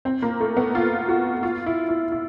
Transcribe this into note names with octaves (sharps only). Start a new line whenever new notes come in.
C4
A#3
A3
B3
F4
F#4
F4
E4
E4
E4